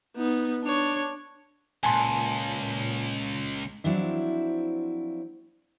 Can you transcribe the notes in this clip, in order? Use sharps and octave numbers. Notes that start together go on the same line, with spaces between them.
B3 D#4
D4 C#5
C#2 A#2 G#5 A5 C6
F3 F#3 C4 D4 E4